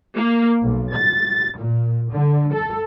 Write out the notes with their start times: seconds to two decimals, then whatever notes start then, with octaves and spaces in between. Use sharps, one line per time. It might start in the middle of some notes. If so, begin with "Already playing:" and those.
0.16 A#3
0.63 B1
0.92 A6
1.58 A#2
2.12 D3
2.53 A4